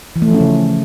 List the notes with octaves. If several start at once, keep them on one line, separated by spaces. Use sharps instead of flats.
E3
A3
F3
C#4
C#3